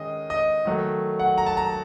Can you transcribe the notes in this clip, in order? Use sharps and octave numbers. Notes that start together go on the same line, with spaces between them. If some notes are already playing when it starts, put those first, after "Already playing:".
Already playing: D#3 G#3 C#4 D#5
D#5
D#3 F#3 A3
F#5
A#5
A5
A#5